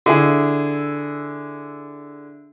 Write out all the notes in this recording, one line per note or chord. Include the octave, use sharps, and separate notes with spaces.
D3 E4 G#4